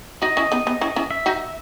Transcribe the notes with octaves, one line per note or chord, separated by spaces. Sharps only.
D#4 F#4 D#5
C#4 E4
B3 D#4
B3 D#4
C#4 E4
C#4 E4
E5
D#4 F#4